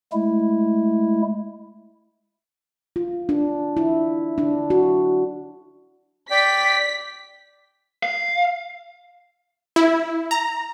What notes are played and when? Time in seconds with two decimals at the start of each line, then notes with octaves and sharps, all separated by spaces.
0.12 G#3 A3 E4
2.96 F4
3.29 D4
3.77 E4
4.38 D4
4.70 F#4
6.31 D5 G5 B6
8.03 F5
9.76 E4
10.31 A#5